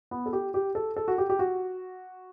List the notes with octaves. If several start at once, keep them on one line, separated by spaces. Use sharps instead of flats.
B3
A4
G4
G4
A4
A4
F#4
G4
G4
F#4